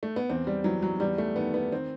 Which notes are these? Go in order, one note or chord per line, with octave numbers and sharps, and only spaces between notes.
A3
B3
E2 C4
G3
E3 F#3
F#3
E2 G3
A3
D#3 B3
B3
D#3 C4